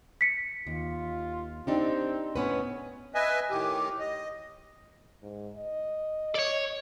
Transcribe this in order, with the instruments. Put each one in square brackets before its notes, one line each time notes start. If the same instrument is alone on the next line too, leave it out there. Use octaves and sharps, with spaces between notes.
[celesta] B6 C#7
[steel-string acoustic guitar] D#2 [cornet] F4
[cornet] C4 [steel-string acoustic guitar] D4 D#4 G4
[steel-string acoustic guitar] A2 B3 B4 [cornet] C#4
[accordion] B4 D#5 E5 G#5
A2 D#3 G4
D#5
[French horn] G#2
D#5
[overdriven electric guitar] C#5 D5